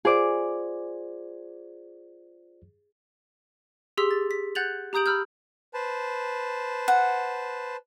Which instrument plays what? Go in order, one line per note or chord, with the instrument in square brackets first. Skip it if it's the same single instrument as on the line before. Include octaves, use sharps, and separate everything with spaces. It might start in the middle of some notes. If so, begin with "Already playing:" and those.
[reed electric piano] F4 C5 D5 [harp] G#4 D6
[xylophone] G4 G#4 C6 E6 B6
A6
B6
F#5 F#6 G6 A6 F7 F#7
G4 A#5 D#6 G6 D7 F#7
B5 E6 F6 G6
[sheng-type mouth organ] B4 C5 A5
[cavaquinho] F#5